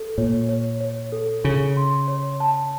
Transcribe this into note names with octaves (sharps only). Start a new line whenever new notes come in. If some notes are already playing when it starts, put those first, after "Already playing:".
Already playing: A4
A#2 C#5
C#5
C#5
A4
C#3 C#5
C6
C#5
A5